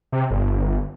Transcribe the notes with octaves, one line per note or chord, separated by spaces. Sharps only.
C3
G1